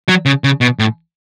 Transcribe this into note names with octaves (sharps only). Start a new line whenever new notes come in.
F#3
C#3
C#3
B2
A2